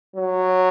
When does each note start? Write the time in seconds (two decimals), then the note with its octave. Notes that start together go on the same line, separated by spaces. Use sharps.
0.16 F#3